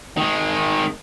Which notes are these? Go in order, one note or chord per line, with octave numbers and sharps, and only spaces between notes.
D#3 G#3